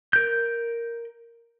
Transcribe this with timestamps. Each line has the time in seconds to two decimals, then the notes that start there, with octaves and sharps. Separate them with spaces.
0.13 A#4 G6